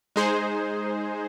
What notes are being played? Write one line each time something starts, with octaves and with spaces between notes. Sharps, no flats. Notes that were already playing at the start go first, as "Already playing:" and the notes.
G#3 D#4 G#4 C5